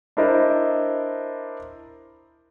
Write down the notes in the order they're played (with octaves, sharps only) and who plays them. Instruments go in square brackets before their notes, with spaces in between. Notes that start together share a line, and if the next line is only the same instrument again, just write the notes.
[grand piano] D4 E4 A#4 C5 D#5